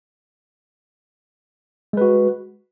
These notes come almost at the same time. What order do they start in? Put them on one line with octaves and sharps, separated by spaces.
G#3 B4 F#4